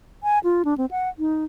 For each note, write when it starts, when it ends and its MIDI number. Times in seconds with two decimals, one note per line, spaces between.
0.23 0.39 80
0.44 0.63 65
0.65 0.77 62
0.78 0.86 60
0.91 1.09 78
1.19 1.44 63